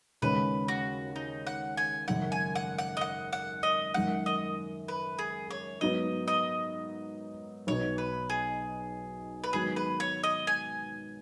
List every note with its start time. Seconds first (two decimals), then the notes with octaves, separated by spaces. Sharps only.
0.22 D#2 C#3 G#3 C#4 B4
0.68 F#4
1.16 D#4
1.47 F#5
1.77 G#5
2.08 G#1 F#2 C#3 F#5
2.32 G#5
2.55 F#5
2.78 F#5
2.97 D#5
3.01 F#5
3.33 F#5
3.63 D#5
3.94 F#2 D#3 G#3 F#5
4.26 D#5
4.88 B4
5.19 G#4
5.51 C#5
5.81 G#2 F#3 B3 D#4 D#5
6.28 D#5
7.67 B1 B2 B3 D#4 C#5
7.98 B4
8.30 G#4
9.44 B4
9.53 G#2 D#3 F#3 B3 G#4
9.76 B4
10.00 C#5
10.23 D#5
10.47 G#5